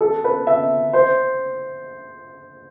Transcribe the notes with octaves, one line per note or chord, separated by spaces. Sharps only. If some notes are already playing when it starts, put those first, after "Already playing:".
A4
B4
E5
C5